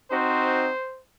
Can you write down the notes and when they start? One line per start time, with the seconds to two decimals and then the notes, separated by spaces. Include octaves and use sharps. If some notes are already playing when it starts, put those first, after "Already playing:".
0.11 C4 D#4 F#4 C5